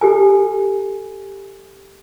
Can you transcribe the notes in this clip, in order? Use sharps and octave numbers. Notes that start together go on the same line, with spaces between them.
G4 A4 G#5